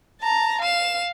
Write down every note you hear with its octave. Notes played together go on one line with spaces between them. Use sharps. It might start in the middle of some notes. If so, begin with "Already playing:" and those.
A5 A#5
F5 E7